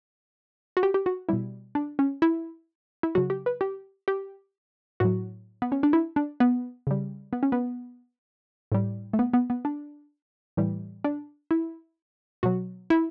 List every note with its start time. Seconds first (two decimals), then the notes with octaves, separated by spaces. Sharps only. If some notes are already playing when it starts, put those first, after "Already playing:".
0.77 F#4
0.83 G4
0.94 G4
1.06 F#4
1.29 B2 G3 E4
1.75 D4
1.99 C#4
2.22 E4
3.03 E4
3.15 C#3 F#3 F#4
3.30 G4
3.46 B4
3.61 G4
4.08 G4
5.00 A2 F#3 F#4
5.62 B3
5.72 C#4
5.83 D4
5.93 E4
6.16 D4
6.40 B3
6.87 C#3 G3
7.33 B3
7.43 C#4
7.52 B3
8.72 A2 G3
9.13 A3
9.19 B3
9.34 B3
9.50 B3
9.65 D4
10.57 A2 E3 G3
11.04 D4
11.51 E4
12.43 B2 F#3 F#4
12.90 E4